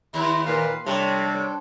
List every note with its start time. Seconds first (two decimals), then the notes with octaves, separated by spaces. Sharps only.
0.14 D#2 E4
0.46 A#2 B4 F5
0.86 C3 G3 D4 A4 C#5